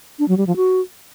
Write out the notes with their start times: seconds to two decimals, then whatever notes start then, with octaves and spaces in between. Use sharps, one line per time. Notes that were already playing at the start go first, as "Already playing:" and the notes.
0.19 D4
0.28 F#3
0.38 G3
0.47 F3
0.56 F#4